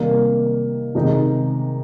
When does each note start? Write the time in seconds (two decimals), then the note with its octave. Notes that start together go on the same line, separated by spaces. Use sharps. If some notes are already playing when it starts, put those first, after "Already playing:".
Already playing: C3 D#3 G3 A#3
0.95 C3 D#3 G#3 D#4